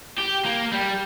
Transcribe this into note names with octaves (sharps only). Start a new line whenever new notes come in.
G4
A#3
G3